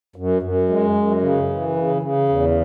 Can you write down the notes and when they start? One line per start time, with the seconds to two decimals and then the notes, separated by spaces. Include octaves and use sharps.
0.16 F#2
0.42 F#2
0.69 G#3
0.95 F#2
1.22 C#3
1.49 E3
1.75 C#3
2.02 C#3
2.28 E2